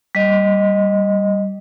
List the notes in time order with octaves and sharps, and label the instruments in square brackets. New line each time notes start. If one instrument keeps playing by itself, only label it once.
[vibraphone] G3 D#5